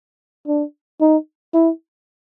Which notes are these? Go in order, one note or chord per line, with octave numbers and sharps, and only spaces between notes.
D4
D#4
E4